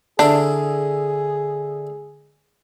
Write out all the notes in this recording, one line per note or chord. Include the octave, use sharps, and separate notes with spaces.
D3 D4 E4 G#4 A#4